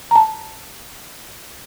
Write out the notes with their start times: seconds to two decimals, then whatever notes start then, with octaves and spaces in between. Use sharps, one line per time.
0.11 A5 A#5